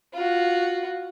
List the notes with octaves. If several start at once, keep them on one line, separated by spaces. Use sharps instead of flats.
F4 F#4